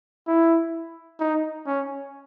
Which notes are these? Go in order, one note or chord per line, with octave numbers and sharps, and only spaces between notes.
E4
D#4
C#4